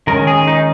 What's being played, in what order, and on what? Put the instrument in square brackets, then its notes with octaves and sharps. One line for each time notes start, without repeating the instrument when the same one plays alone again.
[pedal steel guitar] D#3 G#3 C#4 A#4
G#4
D#4